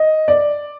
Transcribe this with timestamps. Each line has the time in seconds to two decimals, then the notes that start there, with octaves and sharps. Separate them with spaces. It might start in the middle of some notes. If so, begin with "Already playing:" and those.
Already playing: D#5
0.28 D5